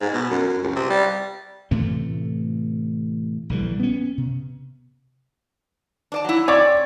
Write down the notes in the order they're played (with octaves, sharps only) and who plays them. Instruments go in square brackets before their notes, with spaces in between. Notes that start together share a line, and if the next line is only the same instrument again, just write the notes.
[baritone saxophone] G#2
B2
F#2
F#2
C#2
C3
G3
[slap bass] A2 C3 E3 A3
A#1 D3 E3 G3
B3 C#4
C3
[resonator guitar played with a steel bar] D4 D5 A5
F#3 E4
[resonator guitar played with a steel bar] C4 [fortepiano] C#5 D5 D6